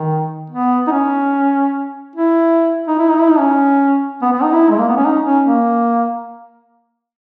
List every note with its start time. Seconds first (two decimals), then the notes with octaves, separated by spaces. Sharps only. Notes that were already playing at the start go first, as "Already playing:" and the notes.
Already playing: D#3
0.50 B3
0.87 D#4
0.91 C#4
2.16 E4
2.87 D#4
2.98 E4
3.08 D#4
3.19 E4
3.29 D#4
3.39 C#4
4.22 B3
4.32 B3
4.43 D#4
4.53 E4
4.70 G#3
4.78 A#3
4.88 B3
4.96 C#4
5.05 D#4
5.25 C#4
5.46 A#3